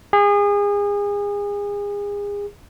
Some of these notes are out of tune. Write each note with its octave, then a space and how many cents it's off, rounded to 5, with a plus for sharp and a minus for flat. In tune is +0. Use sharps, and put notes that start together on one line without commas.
G#4 -30